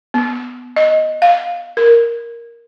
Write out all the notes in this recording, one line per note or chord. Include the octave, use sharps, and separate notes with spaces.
B3
D#5
F5
A#4